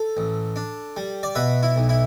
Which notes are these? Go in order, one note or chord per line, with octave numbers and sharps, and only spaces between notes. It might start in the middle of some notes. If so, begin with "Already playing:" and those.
Already playing: A4
A1
D4
G3
D5
B2 B4 E5
E4
B1
E4